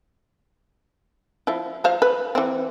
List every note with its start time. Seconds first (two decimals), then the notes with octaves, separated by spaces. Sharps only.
1.47 F3 E4
1.84 F3 C5 F5
2.02 B4
2.35 E3 C4